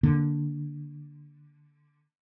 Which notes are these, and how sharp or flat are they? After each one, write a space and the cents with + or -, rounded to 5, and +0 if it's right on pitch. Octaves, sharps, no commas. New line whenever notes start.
D3 +0 A#3 +0